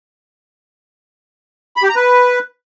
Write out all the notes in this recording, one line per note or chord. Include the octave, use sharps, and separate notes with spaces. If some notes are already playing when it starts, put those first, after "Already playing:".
B5
G4
A#5
B4